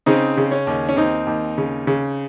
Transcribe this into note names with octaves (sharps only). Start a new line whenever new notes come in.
C#3 C4 D#4
C#3
C#4
D#2
C#4
D#2 C4 D#4
D#2
C#3
C#3